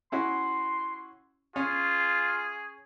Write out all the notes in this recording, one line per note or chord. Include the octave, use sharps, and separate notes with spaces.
C#4 E4 F#4 C6
C#4 F4 G#4 C#5